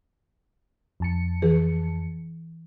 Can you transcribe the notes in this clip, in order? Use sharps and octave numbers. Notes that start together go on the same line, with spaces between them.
F2 A5 C#7
E3 G#4 B4